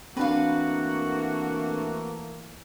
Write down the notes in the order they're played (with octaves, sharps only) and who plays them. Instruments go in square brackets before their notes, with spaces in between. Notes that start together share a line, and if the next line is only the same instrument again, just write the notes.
[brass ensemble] E3 A3 A#3 [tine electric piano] C4 D4 [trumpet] F#4 [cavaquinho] B4 F5